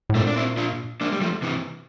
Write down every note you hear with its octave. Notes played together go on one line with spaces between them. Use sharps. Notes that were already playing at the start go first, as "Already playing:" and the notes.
A2
A#2 A3 C4
D4
C4 E4
D4 F4
A#3 D4
G3
F3 A3
C3 E3